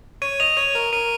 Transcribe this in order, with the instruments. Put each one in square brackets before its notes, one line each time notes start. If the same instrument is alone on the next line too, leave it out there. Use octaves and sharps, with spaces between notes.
[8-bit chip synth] C#5 [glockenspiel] D#7
[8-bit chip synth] D#5 [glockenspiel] F7
[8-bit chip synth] C#5 [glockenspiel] D#7
[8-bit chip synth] A#4
[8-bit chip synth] A#4 [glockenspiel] D#7